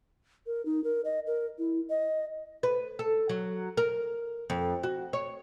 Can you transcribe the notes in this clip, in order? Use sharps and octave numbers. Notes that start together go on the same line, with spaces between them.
A#4
D#4
A#4
D#5
A#4
E4
D#5
B4
A4
F#3
A#4
F2
F#4
C#5